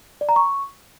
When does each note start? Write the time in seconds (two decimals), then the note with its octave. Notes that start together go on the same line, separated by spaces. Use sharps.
0.21 D5
0.29 A#5
0.36 C#6